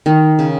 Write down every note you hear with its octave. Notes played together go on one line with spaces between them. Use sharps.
D#3
C#3